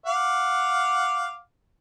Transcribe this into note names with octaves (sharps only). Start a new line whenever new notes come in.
F5 F#5 D6